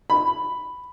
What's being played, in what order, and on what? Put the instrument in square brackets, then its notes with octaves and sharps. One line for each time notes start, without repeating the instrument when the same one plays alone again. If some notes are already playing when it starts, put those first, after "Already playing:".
[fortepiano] B5